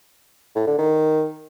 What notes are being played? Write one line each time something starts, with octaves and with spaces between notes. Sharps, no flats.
A2
D3
D#3